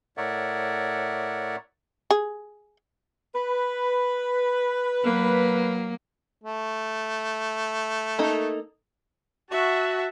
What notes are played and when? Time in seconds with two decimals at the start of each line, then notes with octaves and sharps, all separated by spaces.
0.17 A2 A#4 C#5 D5 E5 F#5
2.11 G#4
3.35 B4
5.04 F#3 A#3
6.44 A3
8.19 A#3 D#4 A4
9.51 F#4 E5 A5